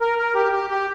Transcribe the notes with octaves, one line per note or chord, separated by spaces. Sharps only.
A#4
A#4
G4
G4
G4